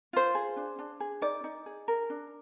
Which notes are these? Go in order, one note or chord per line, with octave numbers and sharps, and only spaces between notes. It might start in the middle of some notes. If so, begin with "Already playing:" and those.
F4 C5
G#4
D4
D4
G#4
D#4 D5
D#4
G#4
A#4
D4